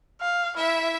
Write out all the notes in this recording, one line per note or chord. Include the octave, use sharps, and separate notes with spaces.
F5
E4 E5